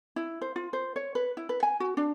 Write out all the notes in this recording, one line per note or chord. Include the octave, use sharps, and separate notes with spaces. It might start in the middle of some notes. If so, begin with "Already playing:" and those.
E4
C5
F4
C5
C#5
B4
E4
B4
G#5
F#4
D4